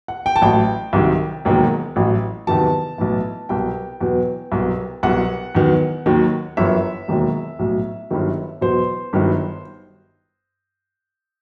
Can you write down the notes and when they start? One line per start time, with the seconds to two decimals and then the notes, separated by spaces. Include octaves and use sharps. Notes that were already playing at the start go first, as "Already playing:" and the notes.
0.08 F#5
0.26 G5
0.36 A5
0.42 A1 A2 F#3 G5
0.93 C2 C3 D#3 F#3
1.45 E1 D#2 D#3 F#3
1.96 A1 A2 F#3
2.47 E2 C3 D#3 F#3 A5
2.98 B1 A2 E3
3.49 C2 B2 F#3 G5
4.01 E2 B2 F#3
4.52 C2 B2 F#3
5.03 C2 B2 F#3 F#5
5.55 E2 D#3 F#3
6.06 D#2 D#3 F#3
6.57 G1 F#2 E3 E5
7.08 E1 D#2 D#3 F#3
7.59 B1 A2 F#3
8.10 G1 G2 D#3 F#3
8.61 E2 B2 F#3 C5
9.13 G1 G2 D#3 F#3